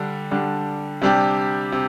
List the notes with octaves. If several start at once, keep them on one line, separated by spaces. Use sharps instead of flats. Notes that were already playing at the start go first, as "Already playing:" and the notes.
Already playing: D3 G3 D4
D3 G3 D4
C3 G3 D4 G4
C3